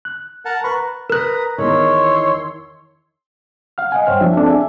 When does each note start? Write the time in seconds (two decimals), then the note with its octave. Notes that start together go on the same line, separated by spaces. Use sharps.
0.05 F#6
0.45 A#4 F#5 A5
0.64 B4 A#5 B5 C#6 F#6
1.10 A#4 B4 A#5 D#6 F#6
1.58 E2 D#3 C#5 C6 E6
3.78 F5 F#5 F6
3.92 D#5 F#5 G#5
4.07 G2 C5 C#5 G5 F6
4.21 F3 D4 E4 E5
4.37 C4 D4 A4
4.49 G#4 E5 G#5